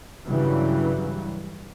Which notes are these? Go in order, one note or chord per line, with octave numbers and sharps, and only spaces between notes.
G2 C#3 E3 F#3 G3